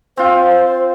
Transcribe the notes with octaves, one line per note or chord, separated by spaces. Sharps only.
C4 F4 C5